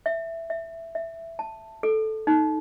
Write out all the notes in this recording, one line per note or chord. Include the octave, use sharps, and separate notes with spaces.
E5
E5
E5
A5
A4
D#4